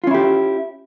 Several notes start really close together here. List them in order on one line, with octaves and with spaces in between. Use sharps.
F4 C#4 E4 G4